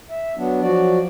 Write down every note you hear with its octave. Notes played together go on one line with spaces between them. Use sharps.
E5
F#3 B3 D4
F3 F#3 F#4 D5